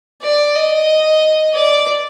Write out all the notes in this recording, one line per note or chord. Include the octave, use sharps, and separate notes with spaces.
D5
D#5
D5